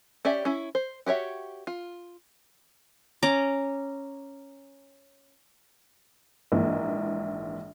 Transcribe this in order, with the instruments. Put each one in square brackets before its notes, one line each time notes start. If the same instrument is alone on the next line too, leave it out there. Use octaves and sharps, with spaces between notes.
[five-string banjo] C#4 G4 D5 E5
C#4 E4
C5
F#4 G4 C#5 E5
F4
[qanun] C#4 A#5 D6
[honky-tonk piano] A#1 G#2 E3 A#3